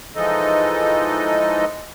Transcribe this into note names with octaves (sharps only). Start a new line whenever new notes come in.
E3 F3 G#3 D#4 A4 D#5